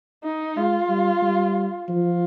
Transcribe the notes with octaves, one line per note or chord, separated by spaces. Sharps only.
D#4
G#3 F4
G3
G3
F3 F4